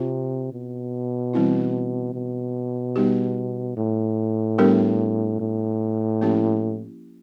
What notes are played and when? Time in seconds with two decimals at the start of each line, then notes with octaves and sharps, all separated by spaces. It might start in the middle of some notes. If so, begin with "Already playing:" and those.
Already playing: C3 C4 F4
0.53 B2
1.34 E3 G3 C4 E4
2.14 B2
2.96 G3 B3 D#4 G4
3.77 A2
4.58 G3 B3 D4 G4 A#4
5.40 A2
6.21 F3 A#3 C#4 E4 G4